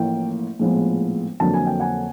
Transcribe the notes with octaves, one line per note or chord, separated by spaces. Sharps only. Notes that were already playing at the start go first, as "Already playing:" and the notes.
Already playing: A1 A2 F3 A#3 G5
A#1 A2 F3 G#3 B3
F2 D3 F#3 A#3 A5
G#5
G5
F#5 G#5